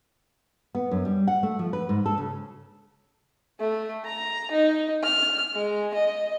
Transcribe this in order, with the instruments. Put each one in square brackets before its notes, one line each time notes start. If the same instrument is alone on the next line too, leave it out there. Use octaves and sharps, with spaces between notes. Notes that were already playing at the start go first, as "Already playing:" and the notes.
[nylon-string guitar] B3
F#2
G3
F#5
A3
F3
B4
G#2
A4
C#3
[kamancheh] A3
A#5
D#4
F6
G#3
D#5